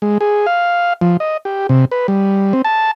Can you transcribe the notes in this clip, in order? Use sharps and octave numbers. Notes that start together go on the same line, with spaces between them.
G#3
G#4
F5
F3
D#5
G4
C3
B4
G3
C4
A5